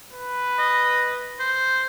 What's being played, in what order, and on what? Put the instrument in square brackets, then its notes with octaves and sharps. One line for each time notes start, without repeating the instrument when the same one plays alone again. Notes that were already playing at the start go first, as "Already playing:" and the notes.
[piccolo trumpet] B4
[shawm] D#5
C5